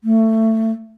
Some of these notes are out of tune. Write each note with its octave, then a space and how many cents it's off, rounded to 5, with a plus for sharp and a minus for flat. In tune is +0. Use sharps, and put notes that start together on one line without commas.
A3 +20